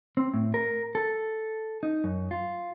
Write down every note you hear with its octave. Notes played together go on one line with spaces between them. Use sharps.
C4
A2
A#4
A4
D#4
F#2
F4